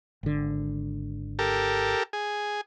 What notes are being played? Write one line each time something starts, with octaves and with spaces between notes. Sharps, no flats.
G#1 D3
G4 A4 A#4
G#4